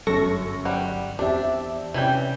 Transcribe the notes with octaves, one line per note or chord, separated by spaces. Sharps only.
G1 F#2 A4 C#6 A#6
G3 F#5
E2 C4 D4 G4 D5 E5
C3 E3 G3 C#4 G5